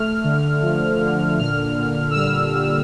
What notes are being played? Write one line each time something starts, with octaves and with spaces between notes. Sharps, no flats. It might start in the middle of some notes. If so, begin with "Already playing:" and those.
Already playing: A3 F6
D3
F3
D3
A#2 F6
A#2
E6
G3 F6
G3